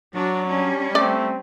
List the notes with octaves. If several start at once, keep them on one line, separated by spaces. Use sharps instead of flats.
F#3 D4 F#4
G3 C#4 D4
A3 C4 D5